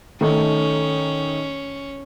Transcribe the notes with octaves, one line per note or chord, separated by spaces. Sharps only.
D#3 A3 C#4 D#4